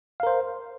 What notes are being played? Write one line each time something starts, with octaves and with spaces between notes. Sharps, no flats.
A#4 C5 F5